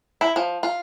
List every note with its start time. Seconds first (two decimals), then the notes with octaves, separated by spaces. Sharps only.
0.21 E4
0.36 F3
0.63 F4